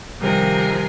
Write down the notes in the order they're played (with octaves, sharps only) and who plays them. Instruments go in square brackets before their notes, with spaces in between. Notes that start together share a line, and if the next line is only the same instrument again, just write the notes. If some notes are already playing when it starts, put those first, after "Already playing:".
[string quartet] C3 D#3 F3 G3 G#4 A#4